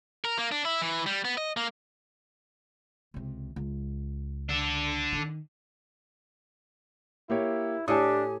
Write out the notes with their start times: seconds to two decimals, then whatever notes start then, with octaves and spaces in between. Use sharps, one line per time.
0.25 A#4
0.38 A#3
0.52 D4
0.65 E4
0.82 E3
1.06 G3
1.25 B3
1.38 D#5
1.57 A#3
3.14 C#2 C3
3.56 C#2
4.49 D4 A4
5.12 D#3 E3
7.30 A#3 E4 G4 C#5
7.88 A2 D4 G4 A4 G#5 D#6